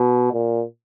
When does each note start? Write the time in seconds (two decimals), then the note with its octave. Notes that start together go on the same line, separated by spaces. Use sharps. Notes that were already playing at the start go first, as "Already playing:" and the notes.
Already playing: B2
0.33 A#2